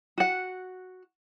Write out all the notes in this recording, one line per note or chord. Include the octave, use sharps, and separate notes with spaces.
F#4 F#5